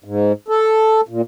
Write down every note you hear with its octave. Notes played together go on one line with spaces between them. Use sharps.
G#2
A4
A#2